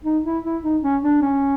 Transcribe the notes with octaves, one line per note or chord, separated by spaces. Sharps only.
D#4
E4
E4
D#4
C#4
D4
C#4